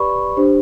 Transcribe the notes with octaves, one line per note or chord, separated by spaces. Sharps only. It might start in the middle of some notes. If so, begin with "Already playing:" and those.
Already playing: G4 B4 D5 B5 C#6
D4 G4 C5